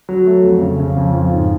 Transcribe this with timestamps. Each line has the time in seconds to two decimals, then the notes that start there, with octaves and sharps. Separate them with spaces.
0.09 F#3
0.26 A3
0.44 F2
0.62 C#3
0.80 C#3
0.97 F2
1.14 F3
1.33 G#2